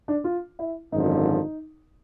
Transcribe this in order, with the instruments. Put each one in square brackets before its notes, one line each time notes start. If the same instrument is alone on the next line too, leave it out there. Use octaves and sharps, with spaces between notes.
[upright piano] D4
F4
E4
[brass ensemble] G#1 F#2 D3 F3 [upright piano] D#4